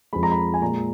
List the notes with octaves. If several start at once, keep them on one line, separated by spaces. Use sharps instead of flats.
F2 F3 G#3 B5
A#5
B5
G#5
A#2 G#3 A#5